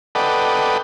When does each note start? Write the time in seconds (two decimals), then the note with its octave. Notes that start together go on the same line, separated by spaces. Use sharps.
0.15 A4 B4 D5 D#5 F#5 G5